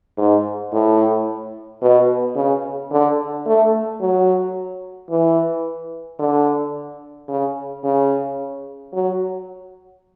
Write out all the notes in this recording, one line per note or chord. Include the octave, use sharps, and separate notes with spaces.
G#2
A2
B2
C#3
D3
A3
F#3
E3
D3
C#3
C#3
F#3